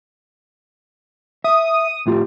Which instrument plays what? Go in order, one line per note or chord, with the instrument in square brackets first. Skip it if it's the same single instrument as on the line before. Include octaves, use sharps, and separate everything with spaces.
[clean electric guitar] E5 [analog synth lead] D#6
[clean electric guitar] A2 F4 G4